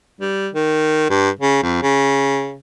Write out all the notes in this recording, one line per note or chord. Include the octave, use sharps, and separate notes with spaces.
G3
D#3
G2
C#3
F2
C#3